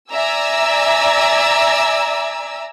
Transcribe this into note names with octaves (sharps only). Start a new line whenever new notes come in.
D5 E5 G#5 A#5 E6